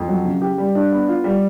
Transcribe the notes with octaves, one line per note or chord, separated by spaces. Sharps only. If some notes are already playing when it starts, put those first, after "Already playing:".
Already playing: F2
F#3
C#3
G4
G3
D4
B3
F4
G3